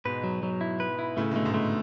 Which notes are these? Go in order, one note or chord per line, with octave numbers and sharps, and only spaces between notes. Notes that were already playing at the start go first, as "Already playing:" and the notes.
G#2 B2 B4
F#3
F#3
E4
B4
E4
A2 C#3 A3
B2 D3 A3
G#2
A3